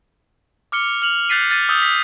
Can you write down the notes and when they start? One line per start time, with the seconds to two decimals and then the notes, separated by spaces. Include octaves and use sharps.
0.72 D6 F6 C#7 G7
1.02 F6 F7 F#7
1.29 F#6 G6 A6 B6 C7 D#7
1.50 F6 A6 D#7
1.69 D#6 E6 G6
1.83 B6